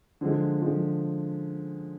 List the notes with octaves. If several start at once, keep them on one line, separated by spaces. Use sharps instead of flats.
D3 F3 G#3
D3 F3 G#3